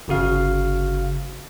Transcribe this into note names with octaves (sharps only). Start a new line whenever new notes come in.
G1 C#3 F#4 F5